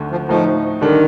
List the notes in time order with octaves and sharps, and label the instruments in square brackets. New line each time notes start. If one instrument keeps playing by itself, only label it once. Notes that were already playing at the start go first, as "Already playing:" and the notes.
Already playing: [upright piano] D2 D3 A3
[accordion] F3
[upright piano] A2 A3 D#4 [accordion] F3
[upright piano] D3 G3 D4 A4 [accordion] D#3